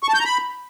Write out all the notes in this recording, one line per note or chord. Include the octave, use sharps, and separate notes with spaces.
C#6
A5
G6
A#5
B5